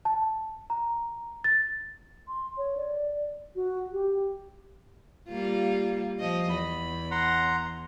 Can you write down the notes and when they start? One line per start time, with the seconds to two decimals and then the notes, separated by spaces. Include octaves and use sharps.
0.05 A5
0.70 A#5
1.44 A6
2.28 C6
2.57 C#5
2.77 D5
3.56 F#4
3.92 G4
5.29 G3 A#3 F4
6.19 F3 D#5
6.50 E2 B5
7.11 F#5 A#5 C6